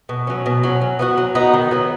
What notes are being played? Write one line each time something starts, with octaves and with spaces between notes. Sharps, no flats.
B2
F#3 C#4
B2
F#3 C#4
F#3
B3 D#4 F#4
F#3
B3 D#4 F#4
D#3
F#3 B3